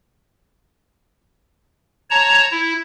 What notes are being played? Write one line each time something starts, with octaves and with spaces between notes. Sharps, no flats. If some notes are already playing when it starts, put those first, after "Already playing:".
C#5 A5 A#5
E4